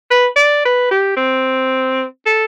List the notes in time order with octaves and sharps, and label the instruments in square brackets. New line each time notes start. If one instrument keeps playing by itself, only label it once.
[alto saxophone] B4
D5
B4
G4
C4
A4